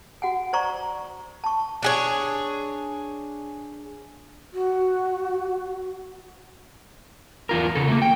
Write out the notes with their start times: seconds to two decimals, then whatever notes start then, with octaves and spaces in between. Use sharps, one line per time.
0.22 F#4 F#5 G#5
0.53 C5 D5 A#5 C#6
1.44 A5 C#6
1.83 D4 G#4 C#5
4.53 F#4
7.49 E2 F4 A#4
7.75 C#3 A4
7.88 A3 A#3
8.02 G5